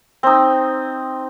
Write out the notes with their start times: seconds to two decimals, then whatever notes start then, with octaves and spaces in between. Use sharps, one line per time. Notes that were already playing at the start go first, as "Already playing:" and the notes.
0.23 C4 D#4